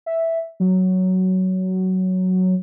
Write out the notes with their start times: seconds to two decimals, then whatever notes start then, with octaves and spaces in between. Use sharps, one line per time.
0.06 E5
0.60 F#3